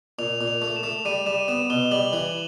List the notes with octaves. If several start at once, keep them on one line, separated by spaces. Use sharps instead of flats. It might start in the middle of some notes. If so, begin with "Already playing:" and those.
A#2 F7
A#2
F7
A3
E7
A3
G3 D#7
G3 E7
D#7
B3 E7
B2 G7
G3 F#7
E3